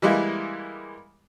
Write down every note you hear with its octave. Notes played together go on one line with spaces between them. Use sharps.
E3 G3 G#3 A#3 E4